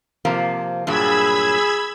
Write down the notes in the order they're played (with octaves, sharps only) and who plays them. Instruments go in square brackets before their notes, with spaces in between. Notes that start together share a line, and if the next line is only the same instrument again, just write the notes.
[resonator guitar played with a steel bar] C3 F3 A#3
[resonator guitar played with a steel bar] G2 A#2 F#3 [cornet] G#4 [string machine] B5 E6 G#6